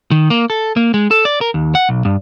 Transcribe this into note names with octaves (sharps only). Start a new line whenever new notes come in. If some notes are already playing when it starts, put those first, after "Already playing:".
D#3
A#3
A4
A#3
G#3
A4
D5
A#4
D#2
F#5
B1
G2